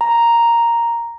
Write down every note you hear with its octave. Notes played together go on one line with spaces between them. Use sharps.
A#5